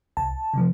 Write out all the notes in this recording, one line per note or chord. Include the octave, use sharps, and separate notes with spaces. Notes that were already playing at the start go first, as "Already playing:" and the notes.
C2 A5
C3 F3